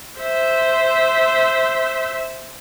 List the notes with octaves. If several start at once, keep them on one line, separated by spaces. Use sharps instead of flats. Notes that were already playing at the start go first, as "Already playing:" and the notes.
C5 E5